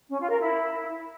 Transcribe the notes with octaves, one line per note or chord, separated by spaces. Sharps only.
C#4
F4
A#4
E4